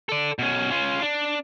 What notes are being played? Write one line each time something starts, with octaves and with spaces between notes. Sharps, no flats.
A4 D5
B2 C#4
C#4 F4
D4